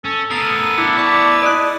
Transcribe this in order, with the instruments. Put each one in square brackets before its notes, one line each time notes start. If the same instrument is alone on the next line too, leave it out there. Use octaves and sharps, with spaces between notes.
[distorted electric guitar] C#4 [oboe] A4
[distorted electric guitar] B3 A#4 [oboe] A4 [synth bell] D#6 C7
[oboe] D4 [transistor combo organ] E4
[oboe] D5 [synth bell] A5 C#6
[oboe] G#4 [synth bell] D5 D#5 F#6